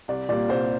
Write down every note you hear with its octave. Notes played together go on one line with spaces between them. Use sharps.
C2 D5
A#2 G3 A#3 D5
C2 C5